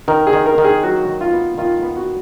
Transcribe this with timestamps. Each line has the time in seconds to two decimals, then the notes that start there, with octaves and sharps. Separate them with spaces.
0.08 D#3 A#4
0.27 G#4
0.33 D#3
0.46 A#4
0.58 D#3
0.64 G#4
0.83 F#3 F#4
1.09 D#3
1.21 F4
1.33 B3
1.58 D#3 F4
1.83 B3
1.96 F#4